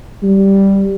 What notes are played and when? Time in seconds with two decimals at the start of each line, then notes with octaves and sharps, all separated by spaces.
0.23 G3